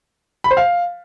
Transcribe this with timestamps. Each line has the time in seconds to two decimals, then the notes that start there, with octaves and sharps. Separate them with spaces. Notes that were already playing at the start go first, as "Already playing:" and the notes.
0.44 B5
0.51 C5
0.57 F5